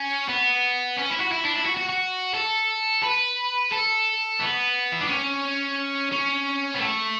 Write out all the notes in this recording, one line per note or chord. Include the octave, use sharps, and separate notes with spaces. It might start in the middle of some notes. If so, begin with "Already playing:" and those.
Already playing: C#4
B3
C#4
E4
F#4
E4
D4
E4
F#4
F#4
F#4
A4
B4
A4
B3
E4
D4
C#4
C#4
B3
A3